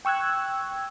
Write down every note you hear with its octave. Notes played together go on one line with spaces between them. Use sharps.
G5 C#6 E6 F#6 G#6